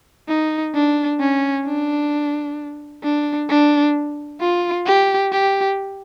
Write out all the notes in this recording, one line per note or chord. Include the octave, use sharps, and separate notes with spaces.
D#4
D4
C#4
D4
D4
D4
F4
G4
G4